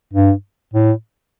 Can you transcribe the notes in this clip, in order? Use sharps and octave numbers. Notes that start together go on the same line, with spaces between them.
G2
A2